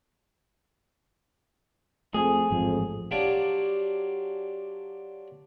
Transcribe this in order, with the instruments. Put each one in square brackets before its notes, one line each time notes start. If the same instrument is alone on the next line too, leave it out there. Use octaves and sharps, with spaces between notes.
[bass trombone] F2 [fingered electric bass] A3 [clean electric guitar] G#4
[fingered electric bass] A1 G#2 F3 [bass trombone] F2
[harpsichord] F#3 D4 F4 G4